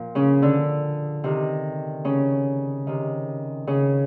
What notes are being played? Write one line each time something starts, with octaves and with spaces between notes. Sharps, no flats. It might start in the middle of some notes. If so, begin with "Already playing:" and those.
Already playing: A#2 F3
C#3 C#4
D3 D4
C3 D#3
C#3 C#4
C3 D#3
C#3 C#4